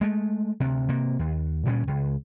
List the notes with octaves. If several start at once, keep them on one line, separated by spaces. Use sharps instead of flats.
G#3 A3
D2 C3
C3 A#3
D#2
D2 A#2 G3 C#4
C#2